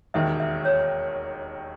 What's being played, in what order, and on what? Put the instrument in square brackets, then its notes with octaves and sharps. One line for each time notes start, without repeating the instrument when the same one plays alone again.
[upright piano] E1 D#2 D#3 [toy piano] E5
[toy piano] E5
C#5